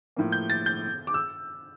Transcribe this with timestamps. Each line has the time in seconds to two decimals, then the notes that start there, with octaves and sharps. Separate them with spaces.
0.16 A2 F3 A#3
0.32 G6
0.50 A6
0.66 G6
1.07 D6
1.14 E6